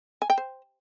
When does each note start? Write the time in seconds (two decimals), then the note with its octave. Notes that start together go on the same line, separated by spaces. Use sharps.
0.22 G#5
0.30 G5
0.38 C5